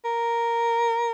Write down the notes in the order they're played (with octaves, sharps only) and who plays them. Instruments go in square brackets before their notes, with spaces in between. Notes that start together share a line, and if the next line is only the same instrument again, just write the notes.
[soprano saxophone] A#4